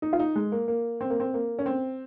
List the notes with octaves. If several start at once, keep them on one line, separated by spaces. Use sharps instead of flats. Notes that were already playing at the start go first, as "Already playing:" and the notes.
D#4
F4
D#4
G#3
A#3
A#3
C4
A#3
C4
A#3
C#4
C4